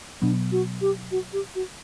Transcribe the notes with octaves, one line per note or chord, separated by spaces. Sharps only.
B2 F#3 B3 D4
F#4
G4
F#4
G4
F#4